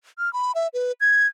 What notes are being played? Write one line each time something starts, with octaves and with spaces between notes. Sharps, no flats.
F6
B5
E5
B4
G#6